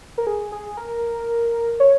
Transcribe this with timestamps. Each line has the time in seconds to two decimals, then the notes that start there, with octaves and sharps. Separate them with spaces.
0.18 A#4
0.27 G#4
0.52 G#4
0.77 A#4
1.80 C#5